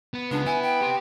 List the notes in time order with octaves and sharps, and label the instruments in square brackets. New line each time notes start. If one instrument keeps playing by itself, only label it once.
[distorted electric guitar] B3
[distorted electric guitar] C#3 G#3 [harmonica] B3 [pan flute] D4
[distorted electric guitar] E4 [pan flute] G#5
[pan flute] G5
[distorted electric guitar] G4 C6